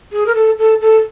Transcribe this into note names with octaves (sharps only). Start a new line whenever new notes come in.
G#4
A#4
A4
A4
A4